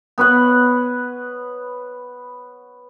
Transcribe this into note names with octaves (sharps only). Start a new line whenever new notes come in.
B3 B4 C#5 F#5